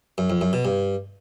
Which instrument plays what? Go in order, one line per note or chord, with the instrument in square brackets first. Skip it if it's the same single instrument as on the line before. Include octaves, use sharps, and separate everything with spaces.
[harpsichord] F#2
F2
F#2
B2
G2